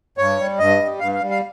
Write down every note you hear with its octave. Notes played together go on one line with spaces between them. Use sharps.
G2 C#5
G3
G2 D#5
G3
G2 F5
F5
G3
F5